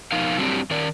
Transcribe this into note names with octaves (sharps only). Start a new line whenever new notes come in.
B2 F3 D#4 A#4 F5
F#3 G3 C4 D4 D#4 G4
D#3 A#4 D5